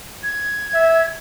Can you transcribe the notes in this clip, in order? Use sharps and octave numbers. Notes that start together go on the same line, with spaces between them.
G#6
E5